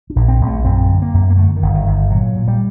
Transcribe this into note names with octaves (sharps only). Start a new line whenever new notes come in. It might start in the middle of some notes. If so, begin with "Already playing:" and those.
D4
A#1
C4
A#1
A3
F#2 C4
D3
A#3
F#2
A#3
D3 A3
D#3
G1
D#3
G1
A#2 F#3
A#2
G3